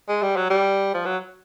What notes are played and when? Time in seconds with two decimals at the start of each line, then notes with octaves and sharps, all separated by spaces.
0.09 G#3
0.22 G3
0.36 F#3
0.50 G3
0.94 F3
1.05 F#3